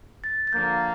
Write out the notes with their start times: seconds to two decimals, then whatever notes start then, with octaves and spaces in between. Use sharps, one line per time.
0.24 A6
0.47 A6
0.53 D3 F3 A#3 G6